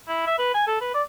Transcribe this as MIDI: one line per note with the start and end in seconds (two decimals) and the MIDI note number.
0.08 0.22 64
0.27 0.38 76
0.39 0.53 71
0.54 0.65 80
0.67 0.77 69
0.81 0.94 71
0.94 1.02 74